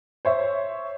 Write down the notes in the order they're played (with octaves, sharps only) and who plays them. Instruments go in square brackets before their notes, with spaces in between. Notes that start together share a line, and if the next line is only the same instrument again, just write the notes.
[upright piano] C5 C#5 E5